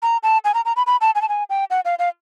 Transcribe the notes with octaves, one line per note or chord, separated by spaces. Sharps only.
A#5
A5
G#5
A#5
A#5
B5
B5
A5
G#5
A5
G#5
G5
F#5
F5
F5